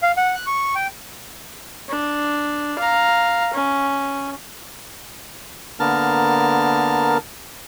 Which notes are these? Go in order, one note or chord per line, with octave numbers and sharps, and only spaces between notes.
F5
F#5
F#6
C#6
G5
D4
F5 A#5
C#4
D3 A#3 B3 A#4 A5 F6